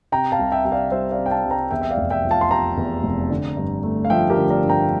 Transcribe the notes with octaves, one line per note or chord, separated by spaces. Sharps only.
C3 G5 A#5
F5 A5
C2
E5 G5
C2 G5
D5 F5
G3 C5 E5
D5 F5
C3
G5
F5 A5
C2
G5 A#5
E2 E5 G5
E5
D5 F5
F1
E5 G5
F3
F5 A5
C6
C3 G5 A#5
E2
F1
D3
G2
A3
F5
F3 E5 G5
G4 A#4
D3
A#4 D5
G2
G5 A#5